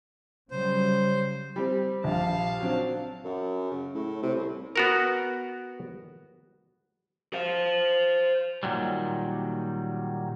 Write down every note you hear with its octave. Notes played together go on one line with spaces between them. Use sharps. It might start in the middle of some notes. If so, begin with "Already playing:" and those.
C#3 F#3 G3 C5
G3 C4
A#1 F5 A5
F#3 C4 D4
F#2
C#3
A2
C3
C2
B3 F#4 A#4
C5 F5
A#2 D#3 F#3 G3